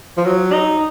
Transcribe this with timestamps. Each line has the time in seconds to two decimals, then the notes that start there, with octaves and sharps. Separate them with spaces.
0.17 F3
0.25 F#3
0.52 D#4